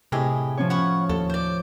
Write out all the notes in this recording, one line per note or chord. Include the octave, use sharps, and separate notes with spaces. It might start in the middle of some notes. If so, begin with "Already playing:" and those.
A2 C3 E4 G4 G#4 D#5
F3 C#4 C#5
F#5 B5 C#6
D#2 A4
C5 D5